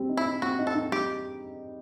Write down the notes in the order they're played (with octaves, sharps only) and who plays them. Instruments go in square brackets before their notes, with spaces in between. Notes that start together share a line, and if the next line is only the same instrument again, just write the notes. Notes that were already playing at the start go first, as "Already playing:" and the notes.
Already playing: [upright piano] G3 C4
D#4
[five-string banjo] E4
[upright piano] D#4
[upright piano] C4 [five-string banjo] F#4
[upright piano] D#4
[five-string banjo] A4
[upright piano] D#4
[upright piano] G3 [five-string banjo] G4